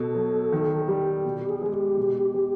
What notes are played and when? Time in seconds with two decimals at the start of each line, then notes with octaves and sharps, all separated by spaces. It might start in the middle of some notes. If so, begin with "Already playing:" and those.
Already playing: B2 A4
0.15 F#3
0.53 D#3
0.88 G3
1.25 B2
1.42 G4
1.49 G#4
1.62 G#3 G#4
1.74 G4
1.97 B2
2.34 G#3